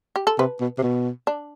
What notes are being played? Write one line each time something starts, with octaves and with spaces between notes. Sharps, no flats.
G4
A4
C3 B4
B2
C3
B2
D4